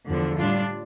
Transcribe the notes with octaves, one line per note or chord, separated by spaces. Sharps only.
E2 D3 F3
A2 G3 D4 F4